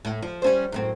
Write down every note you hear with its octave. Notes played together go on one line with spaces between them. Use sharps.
A2
F3
G3 C#4 C5
F#2 A2 C4